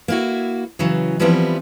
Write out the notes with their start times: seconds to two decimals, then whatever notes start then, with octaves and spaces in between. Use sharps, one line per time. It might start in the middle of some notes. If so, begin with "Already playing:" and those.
0.08 A#3 E4 F#4
0.79 C#3 E3 F#3
1.19 E3 F3 G3 B3 C4 E4